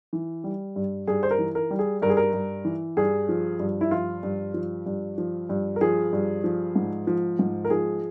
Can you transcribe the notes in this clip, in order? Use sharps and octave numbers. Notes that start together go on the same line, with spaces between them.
E3
G3
G2
G2 G#4
C5
A#4
E3
A#4
G3
G#4
G2 A#4
G#4
A#4
G2
E3
G2 G#4
F3
G2
E4
F3 F4
G2
F3
G2
F3
G2
A#4
F3 G#4
G2
F3
G#2
F3
G#2
A#4
F3 G#4